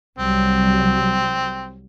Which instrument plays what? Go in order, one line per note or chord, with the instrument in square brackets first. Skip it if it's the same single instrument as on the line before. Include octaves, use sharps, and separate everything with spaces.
[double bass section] C2 F#3 G3 [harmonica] C4